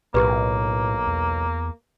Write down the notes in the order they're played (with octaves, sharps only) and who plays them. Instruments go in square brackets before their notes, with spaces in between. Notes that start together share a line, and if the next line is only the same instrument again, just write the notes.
[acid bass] B1 [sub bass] A2 [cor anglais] A#3 [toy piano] G4 B4
[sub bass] E2